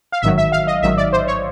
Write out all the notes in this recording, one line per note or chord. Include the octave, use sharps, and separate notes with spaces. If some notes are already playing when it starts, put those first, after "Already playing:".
F5
A1 G#2 D#3 F#3 E5
E5
F5
D#5
A1 G#2 D#3 F#3 E5
D5
C5
C#5